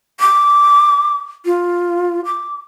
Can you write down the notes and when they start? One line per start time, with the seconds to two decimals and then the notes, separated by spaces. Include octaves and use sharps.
0.20 D6
1.46 F4
2.25 D6